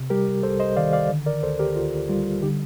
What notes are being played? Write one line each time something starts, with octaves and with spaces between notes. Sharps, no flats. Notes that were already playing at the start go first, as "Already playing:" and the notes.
Already playing: C3
G3 G4 A#4
C2 A4 C5
C5 D#5
D#3 D5 F5
D5 F5
D3
A#4 D5
D2 A4 C5
G4 A#4
D2 F4
G3 F4
D3 D#4 G4